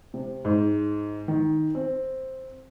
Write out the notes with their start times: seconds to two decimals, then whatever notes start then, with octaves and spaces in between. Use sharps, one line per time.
0.14 C3
0.45 G#2
1.28 D#3
1.75 C4